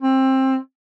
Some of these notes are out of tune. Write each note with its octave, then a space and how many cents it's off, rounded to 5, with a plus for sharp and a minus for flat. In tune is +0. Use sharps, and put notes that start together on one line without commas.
C4 +20